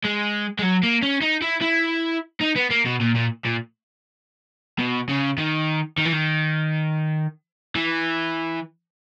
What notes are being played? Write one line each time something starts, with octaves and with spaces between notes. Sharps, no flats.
G#3
G#3
F#3
A#3
C#4
D#4
E4
E4
D#4
B3
A#3
B2
A#2
A#2
A#2
B2
C#3
D#3
D#3
E3
D#3
E3